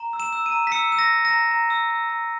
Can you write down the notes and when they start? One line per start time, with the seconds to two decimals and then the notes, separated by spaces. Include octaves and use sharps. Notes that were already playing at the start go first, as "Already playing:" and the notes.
Already playing: A#5
0.13 E6
0.20 E7
0.33 E6
0.46 D#7
0.52 A#5
0.67 B6
0.72 E6 C#7
0.92 E6
0.99 A#6
1.12 E6
1.25 A#6
1.31 A#5
1.51 A#5
1.70 E6
1.90 E6
2.09 A#5